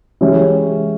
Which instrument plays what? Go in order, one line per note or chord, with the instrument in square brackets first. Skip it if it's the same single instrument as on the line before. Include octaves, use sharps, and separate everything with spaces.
[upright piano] E3 G#3 C#4 E4 G4